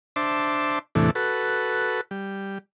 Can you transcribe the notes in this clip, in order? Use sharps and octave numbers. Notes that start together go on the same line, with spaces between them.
D4 C5 E5 A5 C6 D6
E2 A2 C3 E3 A3 D4
F#4 A4 B4
G3